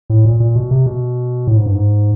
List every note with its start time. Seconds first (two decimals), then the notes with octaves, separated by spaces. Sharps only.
0.10 A2
0.25 A#2
0.40 A#2
0.56 B2
0.71 C3
0.86 B2
1.47 A2
1.56 G#2
1.66 G2
1.75 G#2